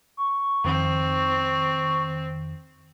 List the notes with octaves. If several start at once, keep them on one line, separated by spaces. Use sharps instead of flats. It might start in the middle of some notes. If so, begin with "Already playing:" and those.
C#6
F2 D#3 C4